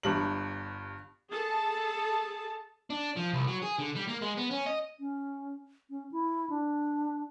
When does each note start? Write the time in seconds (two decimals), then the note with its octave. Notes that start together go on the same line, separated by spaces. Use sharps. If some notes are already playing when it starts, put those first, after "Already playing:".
0.03 G1 G2 F#7
1.29 G#4 A4 A5
2.90 D4
3.17 F3
3.33 C2
3.47 F#3
3.62 G#4
3.78 D3
3.95 G3
4.08 A#3
4.22 G#3
4.37 B3
4.50 C#4
4.66 D#5
5.00 C#4
5.90 C#4
6.12 E4
6.50 D4